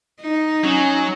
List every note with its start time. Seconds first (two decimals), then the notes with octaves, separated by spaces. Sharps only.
0.21 D#4
0.64 F#3 C#4